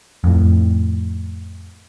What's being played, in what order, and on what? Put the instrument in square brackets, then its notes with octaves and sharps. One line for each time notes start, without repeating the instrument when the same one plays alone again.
[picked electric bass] F2 A2